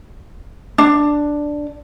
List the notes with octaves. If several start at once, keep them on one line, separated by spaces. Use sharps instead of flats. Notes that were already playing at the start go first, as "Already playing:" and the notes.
D4